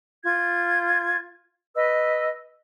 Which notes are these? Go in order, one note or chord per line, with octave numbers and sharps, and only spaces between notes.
F4 G#6
B4 D#5 E6